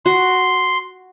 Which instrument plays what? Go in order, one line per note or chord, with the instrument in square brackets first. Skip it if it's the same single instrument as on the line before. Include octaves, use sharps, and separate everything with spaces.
[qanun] F#4 [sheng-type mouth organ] C6